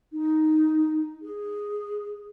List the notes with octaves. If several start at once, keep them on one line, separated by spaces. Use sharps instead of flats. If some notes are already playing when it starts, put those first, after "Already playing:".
D#4
G#4